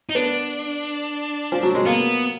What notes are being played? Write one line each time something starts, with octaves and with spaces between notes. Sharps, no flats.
D#4
B3 D4
F3
F#3
G#3
A#3 B3